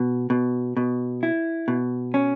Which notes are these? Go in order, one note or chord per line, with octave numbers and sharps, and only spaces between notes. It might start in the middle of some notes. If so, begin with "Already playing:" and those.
Already playing: B2
B2
B2
E4
B2
C#4